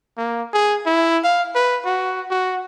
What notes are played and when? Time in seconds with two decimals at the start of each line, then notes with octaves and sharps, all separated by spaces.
0.17 A#3
0.53 G#4
0.86 E4
1.24 F5
1.55 B4
1.85 F#4
2.30 F#4